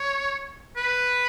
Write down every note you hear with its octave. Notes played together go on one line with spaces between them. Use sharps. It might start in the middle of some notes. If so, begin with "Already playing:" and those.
Already playing: C#5
B4